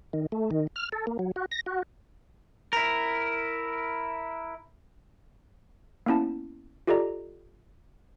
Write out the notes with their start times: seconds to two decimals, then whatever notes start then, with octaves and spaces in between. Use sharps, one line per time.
0.13 D#3
0.32 A3
0.51 D#3
0.76 F6
0.92 A4
1.07 A#3
1.19 F#3
1.36 F#4
1.51 A#6
1.66 F#4
2.73 E4 A#4
6.06 A#3 B3 C#4 E4 A5
6.87 F4 G4 A4 D5 D#5 A#5